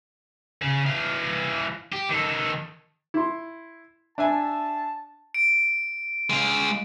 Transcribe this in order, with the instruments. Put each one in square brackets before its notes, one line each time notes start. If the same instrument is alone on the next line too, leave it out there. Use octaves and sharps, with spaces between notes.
[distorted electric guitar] C#3 G#4
E3 F5
G4
D#3 A4
[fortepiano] E4 C6
[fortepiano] D4 E5 G#5 [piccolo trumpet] A5
[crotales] D7
[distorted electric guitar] G#3 F5